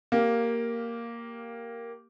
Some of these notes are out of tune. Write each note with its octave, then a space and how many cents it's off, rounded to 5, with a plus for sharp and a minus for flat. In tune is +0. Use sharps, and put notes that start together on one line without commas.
A#3 +0 G4 +0